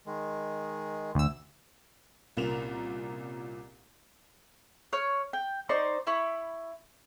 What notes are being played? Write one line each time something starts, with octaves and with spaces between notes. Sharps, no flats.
D#3 G#3
D2 E6
C2 A#2 C#4 A#4 E7 F7
C#5 F6
G5
D#4 C5 D5 C#6
E4 B5 C#6